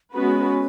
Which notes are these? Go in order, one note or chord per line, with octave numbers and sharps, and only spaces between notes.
G#3 B3 C#4 F#4 B4